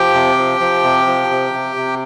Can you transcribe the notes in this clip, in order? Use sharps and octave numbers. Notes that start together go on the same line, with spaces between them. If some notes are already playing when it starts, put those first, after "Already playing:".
Already playing: F3 G4 G5
C3
F3
F3
C3
F3
C3
C3
C3